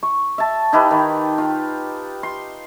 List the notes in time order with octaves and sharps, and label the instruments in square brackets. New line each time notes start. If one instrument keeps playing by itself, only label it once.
[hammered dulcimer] C#6
E5 A5
D#4 E4 G4 B4
D#3
F4
C6